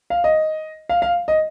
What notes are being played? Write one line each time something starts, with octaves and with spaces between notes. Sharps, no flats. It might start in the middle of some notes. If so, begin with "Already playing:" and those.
F5
D#5
F5
F5
D#5